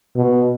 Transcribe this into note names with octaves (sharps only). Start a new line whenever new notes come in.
B2